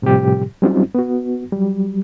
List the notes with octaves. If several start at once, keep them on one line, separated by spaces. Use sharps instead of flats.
A2 C3 F3 G3 G4
F#3 G3 C4 C#4 D#4 F4
B3 F#4
F#3 G3